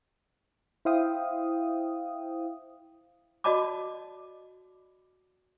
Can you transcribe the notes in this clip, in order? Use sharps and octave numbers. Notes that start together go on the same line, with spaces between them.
E4 C5 E5 F5 G5 D#6
F#4 D5 D#5 A5 B5 D6